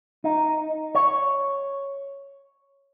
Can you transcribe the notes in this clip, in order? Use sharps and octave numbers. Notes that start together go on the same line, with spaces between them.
D#4
C#5